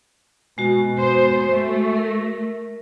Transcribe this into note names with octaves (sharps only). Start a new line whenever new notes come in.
B2 G#3 F#4
B3 C5
A3
A#4